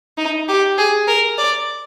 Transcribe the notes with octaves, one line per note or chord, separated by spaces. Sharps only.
D#4
G4
G#4
A#4
D5